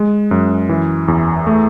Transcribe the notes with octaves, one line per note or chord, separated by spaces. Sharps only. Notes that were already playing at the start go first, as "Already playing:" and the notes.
Already playing: G#3
F#2
E3
E2
A3